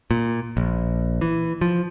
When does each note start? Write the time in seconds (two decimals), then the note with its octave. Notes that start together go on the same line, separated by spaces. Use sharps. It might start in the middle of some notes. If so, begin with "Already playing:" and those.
0.11 A#2
0.57 A#1
1.21 E3
1.61 F3